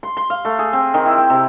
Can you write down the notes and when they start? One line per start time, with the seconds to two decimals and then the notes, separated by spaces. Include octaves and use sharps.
0.03 C6
0.17 C6
0.30 F5
0.45 A3
0.59 G#4
0.73 C4
0.94 D#3
1.06 E4
1.18 G5
1.30 C3